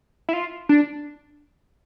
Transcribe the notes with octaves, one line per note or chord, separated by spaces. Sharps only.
E4
F4
D4